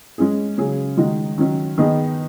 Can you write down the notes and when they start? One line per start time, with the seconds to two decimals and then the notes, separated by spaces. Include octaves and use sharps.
0.18 G#3 C#4 G#4
0.58 C#3 F#3 C#4 G#4
0.97 D#3 G#3 D#4 F#4
1.38 D#3 F#3 C#4
1.78 D#3 B3 D#4 G#4